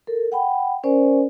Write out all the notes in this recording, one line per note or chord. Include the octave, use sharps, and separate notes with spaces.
A4 A#4
F#5 G5 B5
C#4 A#4 C5 D5 G#5